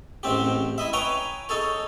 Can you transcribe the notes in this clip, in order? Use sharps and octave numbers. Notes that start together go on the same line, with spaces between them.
A1 G#2 C4 G4
E4 D#5 E5
B4 C#5 G5 G#5 A#5
D#4 G#4 A4 C#5